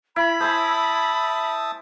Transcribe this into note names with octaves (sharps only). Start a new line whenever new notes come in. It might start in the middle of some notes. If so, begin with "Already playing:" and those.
E4 B5
C5 E5 G#5 A5 D#6